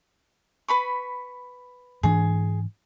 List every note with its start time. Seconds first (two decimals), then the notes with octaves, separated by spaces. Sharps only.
0.68 B4 B5 C#6
2.03 G#2 E3 D4 G#4